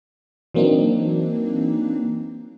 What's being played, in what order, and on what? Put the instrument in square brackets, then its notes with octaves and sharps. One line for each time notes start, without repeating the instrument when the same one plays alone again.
[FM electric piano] E3 F#3 A#3 C4 D4 D#4